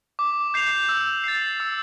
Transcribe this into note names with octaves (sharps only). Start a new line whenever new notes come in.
D6
G6 C7 F7
E6
A6 C7
E6